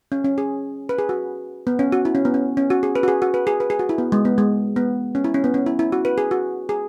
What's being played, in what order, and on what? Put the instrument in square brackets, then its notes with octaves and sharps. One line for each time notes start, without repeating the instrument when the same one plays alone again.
[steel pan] C#4
C#4
G#4
B4
G#4
F#4
B3
C#4
F#4
E4
C#4
B3
C#4
C#4
F#4
G#4
B4
F#4
G#4
F#4
B4
G#4
B4
G#4
F#4
E4
B3
G#3
B3
G#3
B3
C#4
E4
C#4
B3
C#4
E4
E4
F#4
B4
G#4
F#4
G#4